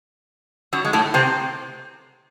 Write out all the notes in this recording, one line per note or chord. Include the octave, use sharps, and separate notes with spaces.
F#2 F#3
G#3
A2 A3
C3 C4